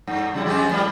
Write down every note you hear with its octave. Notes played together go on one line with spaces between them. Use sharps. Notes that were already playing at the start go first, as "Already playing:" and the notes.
G2
C#3 G3 E4
F2 G#3 G4
G#2 G3